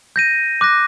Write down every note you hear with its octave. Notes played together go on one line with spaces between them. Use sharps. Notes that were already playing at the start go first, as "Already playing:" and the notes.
G6 A#6 D#7
D6 F#6 A#6